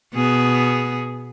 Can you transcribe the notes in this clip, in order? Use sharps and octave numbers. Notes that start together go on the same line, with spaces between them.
B2 B3 G#4